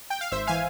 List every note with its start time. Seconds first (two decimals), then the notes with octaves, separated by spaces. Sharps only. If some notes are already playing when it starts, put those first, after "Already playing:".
0.10 G5
0.21 F5
0.31 G#1 C5 E5
0.47 E3 F5 G#5